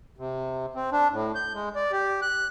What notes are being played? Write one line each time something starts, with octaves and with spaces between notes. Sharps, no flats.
C3
C4
D4
A2
G6
G#3
D5
G4
F#6